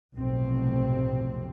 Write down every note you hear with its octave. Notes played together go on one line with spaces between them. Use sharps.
F1 B1 F2 A2 C3 C4